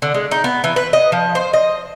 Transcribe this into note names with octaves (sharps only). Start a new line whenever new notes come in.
D3
G#3
D#4
B3
E3
B4
D#5
F3
C5
D#5